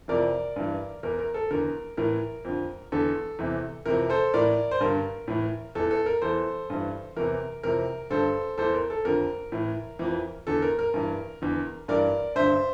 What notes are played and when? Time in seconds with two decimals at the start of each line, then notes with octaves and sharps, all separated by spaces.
0.08 F2 C3 E3 A#4 D5
0.56 G2 E3
1.03 E2 E3 A#4
1.19 A#4
1.34 A4
1.51 E2 D3 A#4
1.97 A2 E3 A#4
2.45 F2 D3
2.92 E2 D3 A4
3.39 E2 C3 E3
3.86 F2 C3 E3 A#4
4.10 A4 C5
4.34 A2 E3 A#4 D5
4.71 C5
4.80 G2 D3 A#4
5.28 A2 E3
5.75 E2 E3 A4
5.91 A4
6.06 A#4
6.22 E2 E3 A4 C5
6.70 G2 E3
7.16 E2 C3 E3 A#4
7.63 F2 C3 E3 A#4
8.10 G2 D3 A4 C5
8.58 E2 E3 A4 C5
8.74 A#4
8.90 A4
9.05 F2 D3 A#4
9.52 A2 E3
9.99 F2 E3
10.47 E2 D3 A4
10.62 A#4
10.79 A#4
10.94 G2 E3
11.42 E2 D3
11.88 G2 E3 A#4 D5
12.35 G2 D3 C5 E5